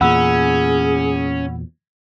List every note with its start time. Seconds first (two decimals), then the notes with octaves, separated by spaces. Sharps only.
0.01 E2 A#2 C#4 G#4 F#5 B5 E6